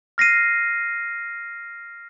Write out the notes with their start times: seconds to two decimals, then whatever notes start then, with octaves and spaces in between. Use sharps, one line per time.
0.18 F6 A#6 C7 D#7